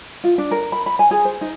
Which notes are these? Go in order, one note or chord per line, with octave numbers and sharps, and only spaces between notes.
F4
D4
A#4
B5
B5
G#5
G#4
C5
D#4